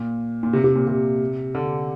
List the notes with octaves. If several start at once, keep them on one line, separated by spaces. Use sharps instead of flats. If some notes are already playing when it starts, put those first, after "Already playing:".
Already playing: A#2
A#2
C3
C3
A#2
C3
D3